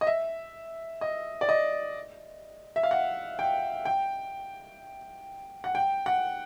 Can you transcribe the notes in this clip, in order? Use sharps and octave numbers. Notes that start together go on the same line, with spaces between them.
D#5
E5
D#5
D5
D#5
E5
F5
F#5
G5
G5
F#5
G5
F#5